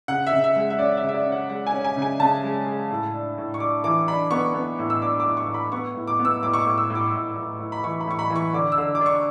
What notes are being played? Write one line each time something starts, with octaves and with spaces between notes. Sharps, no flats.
C#3 F#5
E5
C#3
E5
G#3
E5
C#4 D5
E5
C#3
E5
D5
C#4
F#5
G#3 F#5
G#5
C#4
G#5
C#3
G#5
C#3 A5
G#3
G#3
A2
D4
A2
C#6
D4 D6
E3 D6
D4 B5
B3 C#6
B3
A2
E6
D4 D6
D6
A2
C#6
A2
B5
B3 C#6
A2
D6
B3
E6
A2 D6
C#6
D6
A2
E6
A2
D6
A2
A2
A2
B5
E3 C#6
B5
A2 C#6
B5
E3
C#6
D3 D6
E6
D3
D6
D4
C#6